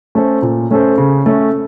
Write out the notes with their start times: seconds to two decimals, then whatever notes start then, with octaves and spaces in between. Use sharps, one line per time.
0.15 A3 C#4 A4 C5
0.42 A#2
0.71 A3 C#4 A4 C5
0.98 C#3
1.26 A3 C#4